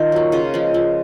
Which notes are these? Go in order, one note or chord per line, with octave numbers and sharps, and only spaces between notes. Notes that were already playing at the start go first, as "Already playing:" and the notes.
Already playing: D#3 D#4 F4
F#3 A#3
C#3 F4
F3 G#3
F3